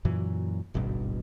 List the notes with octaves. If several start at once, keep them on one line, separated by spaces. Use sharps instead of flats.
F#2 A#2 E3 F#3
D1 G#1 G2 B2